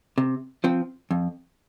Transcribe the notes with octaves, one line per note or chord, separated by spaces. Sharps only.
C3
F3 C4
F2